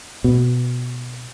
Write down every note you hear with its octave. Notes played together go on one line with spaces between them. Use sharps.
B2